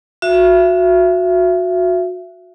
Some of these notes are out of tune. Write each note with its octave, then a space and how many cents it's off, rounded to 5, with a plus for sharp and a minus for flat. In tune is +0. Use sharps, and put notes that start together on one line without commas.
F#4 -25 E5 +30